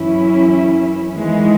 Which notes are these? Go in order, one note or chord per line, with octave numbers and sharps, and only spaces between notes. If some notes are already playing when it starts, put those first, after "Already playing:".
Already playing: F#2 E3 C#4 E4
E2 D#3 E3 G#3